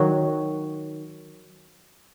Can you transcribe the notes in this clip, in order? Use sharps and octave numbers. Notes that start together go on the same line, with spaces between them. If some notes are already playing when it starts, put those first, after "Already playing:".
Already playing: D#3 F#3